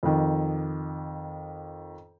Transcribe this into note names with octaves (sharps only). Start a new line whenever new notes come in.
F2 D#3